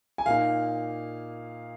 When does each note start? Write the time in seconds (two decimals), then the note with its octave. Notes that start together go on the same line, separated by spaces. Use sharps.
0.18 G#5
0.26 A#2 A#3 D#4 F5